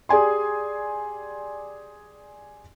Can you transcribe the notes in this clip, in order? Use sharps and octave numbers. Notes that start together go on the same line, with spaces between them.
G4 G#4 D5 G#5 C6